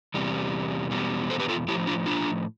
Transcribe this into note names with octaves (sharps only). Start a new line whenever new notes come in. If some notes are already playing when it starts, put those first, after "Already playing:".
E2 C3 G3
E2 B2 G3
A4 C5
G4 B4
F4 A4
A2 F3 E4 G4
D4 F4
D4 F4